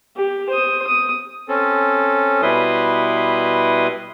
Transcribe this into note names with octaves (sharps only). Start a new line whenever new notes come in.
G4
C5 D#6
D#6
C4 C#4 A4
B2 G3 E4 B4 C6 D#6